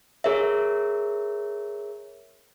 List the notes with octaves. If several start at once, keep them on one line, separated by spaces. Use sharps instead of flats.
G#4 A#4 C#5 E5